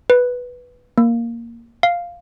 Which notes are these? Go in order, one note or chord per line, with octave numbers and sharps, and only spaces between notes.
B4
A#3
F5